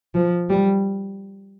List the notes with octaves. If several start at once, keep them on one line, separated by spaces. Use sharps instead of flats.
F3
G3